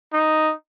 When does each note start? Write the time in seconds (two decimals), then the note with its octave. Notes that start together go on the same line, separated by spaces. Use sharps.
0.13 D#4